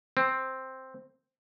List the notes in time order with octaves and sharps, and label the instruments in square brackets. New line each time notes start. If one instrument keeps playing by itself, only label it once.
[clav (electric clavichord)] C4